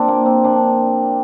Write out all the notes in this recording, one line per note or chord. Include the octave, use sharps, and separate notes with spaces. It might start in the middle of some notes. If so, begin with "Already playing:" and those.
Already playing: A#2 F3 C4 D4
A#3
C4
A#2 F3 D4